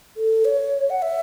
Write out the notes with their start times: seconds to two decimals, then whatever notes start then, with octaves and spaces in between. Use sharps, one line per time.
0.17 A4
0.45 C#5
0.90 F#5
1.02 E5